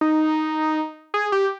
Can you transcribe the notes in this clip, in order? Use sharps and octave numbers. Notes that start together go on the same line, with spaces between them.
D#4
G#4
G4